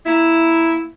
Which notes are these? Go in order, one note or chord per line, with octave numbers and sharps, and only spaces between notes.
A#3 E4